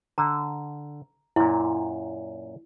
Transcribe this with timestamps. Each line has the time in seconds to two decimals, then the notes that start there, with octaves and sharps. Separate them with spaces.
0.18 D3 A#5
1.36 F#2 A#2 E4